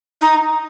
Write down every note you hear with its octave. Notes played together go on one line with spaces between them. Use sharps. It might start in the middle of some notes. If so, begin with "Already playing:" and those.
D#4